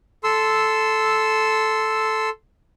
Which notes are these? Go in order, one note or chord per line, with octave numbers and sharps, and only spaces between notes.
A4 C6 E6